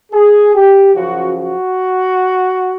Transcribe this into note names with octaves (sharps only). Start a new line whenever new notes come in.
G#4
G4
F#2 C#3 F3 F#4
F#4